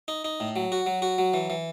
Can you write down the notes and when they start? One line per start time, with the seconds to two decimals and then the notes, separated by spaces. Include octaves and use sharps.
0.08 D#4
0.25 D#4
0.40 A2
0.56 F#3
0.72 F#4
0.86 F#3
1.02 F#4
1.18 F#3
1.34 E3
1.50 E3